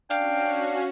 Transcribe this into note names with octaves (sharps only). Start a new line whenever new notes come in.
C#4 D4 F#4 F5 G5